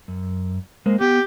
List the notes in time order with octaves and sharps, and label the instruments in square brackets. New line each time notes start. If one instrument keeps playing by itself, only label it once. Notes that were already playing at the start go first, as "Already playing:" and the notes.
[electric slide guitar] F#2
G#3 A#3 C5
[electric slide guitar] B3 [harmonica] G4